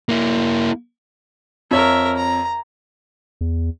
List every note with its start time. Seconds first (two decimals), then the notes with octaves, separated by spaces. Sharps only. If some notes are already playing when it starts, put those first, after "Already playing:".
0.09 A#3 E4
1.71 F2 A#4 C#5 E5
2.17 A#5
3.41 E2